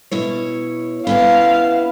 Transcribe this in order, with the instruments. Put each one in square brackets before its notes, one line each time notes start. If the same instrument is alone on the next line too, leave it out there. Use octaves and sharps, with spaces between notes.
[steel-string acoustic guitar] B2 E4 C#5
[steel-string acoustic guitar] B3 C#4 E4 [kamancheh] F5